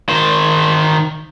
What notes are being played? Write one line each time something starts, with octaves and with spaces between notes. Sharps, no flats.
D#3 C5